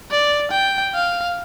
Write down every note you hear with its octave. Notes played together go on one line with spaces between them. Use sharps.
D5
G5
F5